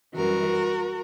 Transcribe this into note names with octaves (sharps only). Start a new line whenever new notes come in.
F#2 E3 G3 F#4 A#4